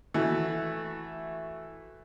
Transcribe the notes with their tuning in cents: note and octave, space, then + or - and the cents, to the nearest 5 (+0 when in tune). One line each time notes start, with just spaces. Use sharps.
E3 +0 A3 +0 F#4 +0